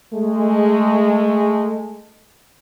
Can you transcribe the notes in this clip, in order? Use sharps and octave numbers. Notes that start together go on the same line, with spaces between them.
G#3 A3